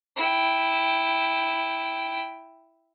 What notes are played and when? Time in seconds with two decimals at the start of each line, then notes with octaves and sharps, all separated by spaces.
0.17 E4 G5